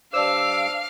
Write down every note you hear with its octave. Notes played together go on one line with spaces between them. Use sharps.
G2 C5 D5 F5 A5 D6 E6